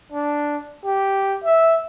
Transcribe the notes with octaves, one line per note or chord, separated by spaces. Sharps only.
D4
G4
E5